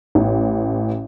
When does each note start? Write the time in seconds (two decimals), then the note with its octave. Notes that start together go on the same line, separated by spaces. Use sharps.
0.15 A1